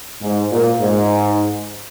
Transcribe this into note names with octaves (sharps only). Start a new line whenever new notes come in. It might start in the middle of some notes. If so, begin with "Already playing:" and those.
G#2
A#2
G#2